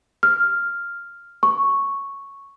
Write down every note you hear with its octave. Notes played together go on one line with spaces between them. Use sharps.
F6
C#6